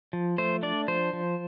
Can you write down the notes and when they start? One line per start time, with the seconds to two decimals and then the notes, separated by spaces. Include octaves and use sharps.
0.13 F3
0.38 A3 C5
0.63 D4 D5
0.88 F3 C5
1.13 F3